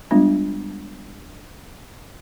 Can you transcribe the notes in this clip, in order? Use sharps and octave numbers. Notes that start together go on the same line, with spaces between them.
G3 G#3 B3 D4 F4